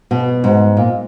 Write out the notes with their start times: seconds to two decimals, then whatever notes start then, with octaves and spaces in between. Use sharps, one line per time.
0.11 B2
0.44 G#2
0.77 A#2